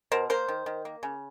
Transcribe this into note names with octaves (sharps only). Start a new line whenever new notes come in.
B2 A#4 C5
A#3 A#4 C5
D#3
D#3
A#3
C#3